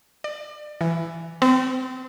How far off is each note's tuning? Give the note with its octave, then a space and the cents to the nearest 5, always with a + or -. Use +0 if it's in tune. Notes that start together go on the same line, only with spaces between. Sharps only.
D5 +30
E3 +10
C4 -30